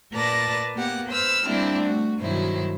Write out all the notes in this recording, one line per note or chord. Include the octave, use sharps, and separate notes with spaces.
A#2 A#4 B4 D5 A5 A#6
A#3 B3 G4 F#5
B4 C5 E6 F6
G3 A#3 C4 D4 E4
A3 F#4
G2 B2 D#3 F#3 E4 C5